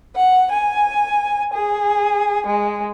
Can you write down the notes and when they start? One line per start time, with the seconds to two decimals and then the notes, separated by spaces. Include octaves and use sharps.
0.16 F#5
0.51 G#5
1.54 G#4
2.47 G#3